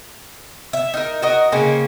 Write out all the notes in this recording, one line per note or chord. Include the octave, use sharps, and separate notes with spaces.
E5
D#4 A#4
F#4 A#4 D#5
C#3 A#3 C4 C#4